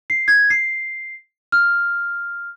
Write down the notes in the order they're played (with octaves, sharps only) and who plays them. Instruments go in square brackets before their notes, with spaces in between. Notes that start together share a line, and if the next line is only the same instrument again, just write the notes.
[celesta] C7
G#6
C7
F6